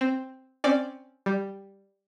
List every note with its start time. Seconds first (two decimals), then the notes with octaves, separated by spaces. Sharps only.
0.01 C4
0.64 C4 C#4 D5
1.26 G3